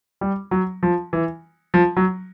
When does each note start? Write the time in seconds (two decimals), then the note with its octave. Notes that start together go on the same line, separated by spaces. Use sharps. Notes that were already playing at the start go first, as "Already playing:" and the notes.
0.21 G3
0.51 F#3
0.83 F3
1.13 E3
1.74 F3
1.97 F#3